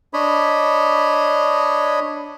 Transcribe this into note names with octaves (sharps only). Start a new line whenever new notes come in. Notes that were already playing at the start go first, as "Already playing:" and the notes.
D4 C#5 D#5 B5